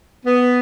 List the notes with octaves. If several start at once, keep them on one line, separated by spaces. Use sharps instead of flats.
B3